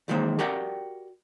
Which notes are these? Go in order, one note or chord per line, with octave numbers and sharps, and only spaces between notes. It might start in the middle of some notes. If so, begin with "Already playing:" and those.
B1 E2 D#3 G#3 A#3 C5
F#4 G4 A#4 D5 F#5 G5